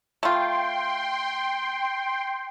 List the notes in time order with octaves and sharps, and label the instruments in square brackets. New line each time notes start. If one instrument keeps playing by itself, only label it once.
[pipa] A3 F4 [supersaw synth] G5 C6